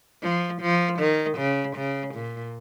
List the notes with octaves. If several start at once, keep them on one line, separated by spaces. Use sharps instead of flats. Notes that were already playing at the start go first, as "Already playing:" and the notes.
F3
F3
D#3
C#3
C#3
A#2